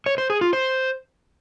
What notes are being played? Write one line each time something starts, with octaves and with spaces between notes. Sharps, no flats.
C#5
C5
G#4
F4
C5